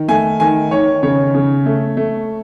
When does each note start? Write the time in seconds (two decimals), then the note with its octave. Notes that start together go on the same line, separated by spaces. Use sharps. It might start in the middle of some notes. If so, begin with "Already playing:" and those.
Already playing: D#3
0.08 A3 G#5
0.40 D#3 G#5
0.71 D#3 C#5
1.03 C#3 C#5
1.34 C#3
1.66 A3
1.97 A3